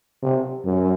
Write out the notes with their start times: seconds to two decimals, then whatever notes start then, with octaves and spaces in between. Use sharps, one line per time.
0.23 C3
0.65 F#2